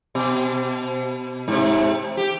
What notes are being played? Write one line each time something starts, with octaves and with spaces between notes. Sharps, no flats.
B2
G#2 C3
G4